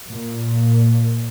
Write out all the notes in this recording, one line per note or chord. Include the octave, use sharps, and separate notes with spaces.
A#2